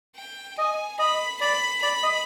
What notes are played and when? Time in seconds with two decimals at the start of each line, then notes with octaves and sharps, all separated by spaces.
0.16 G5
0.58 D#5 G#5
0.99 D#5 B5
1.41 D5 B5
1.82 D5 B5
2.03 D#5